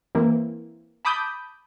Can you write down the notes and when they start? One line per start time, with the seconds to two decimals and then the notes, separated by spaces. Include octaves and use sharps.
0.15 E3 A#3 C4
1.05 A5 B5 D6 D#6 G6